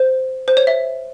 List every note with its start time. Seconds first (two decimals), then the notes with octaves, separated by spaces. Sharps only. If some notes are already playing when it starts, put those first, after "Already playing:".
Already playing: C5
0.48 C5
0.57 C#5
0.67 E5